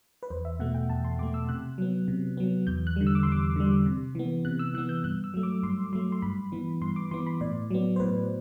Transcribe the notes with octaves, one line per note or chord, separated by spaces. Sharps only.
B4
E2 C5
E5
B2 A3 F#5
G5
E2 A5
C6
B2 A3 D6
E6
C3 F#6
F#3 B3
C3
F#3 B3
E2 G6
F#6
D3 G3
E6
D6
C6
E2
D6
D3 G3
C3
E3 B3
C3 F#6
E6
E3 B3 F#6
G6
G2 F#6
E6
F#3 A3
D6
G2 C6
F#3 A3 C6
C6
G2 B5
E3 B3
G2 C6
D6
E3 B3 C6
B5
A2 D5
F#3 B3
C5
A2 B4